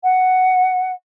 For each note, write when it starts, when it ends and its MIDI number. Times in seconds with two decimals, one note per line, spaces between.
0.03 0.91 78